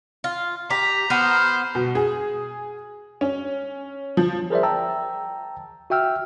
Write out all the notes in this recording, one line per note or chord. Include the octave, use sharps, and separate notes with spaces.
F4
G4 A#5 B6
B3 C5 F6
B2
G#4
C#4
F3
G#4 A#4 C5 D5 E5
G5 A5 A#5 E6
F#4 E5 G5 E6 F6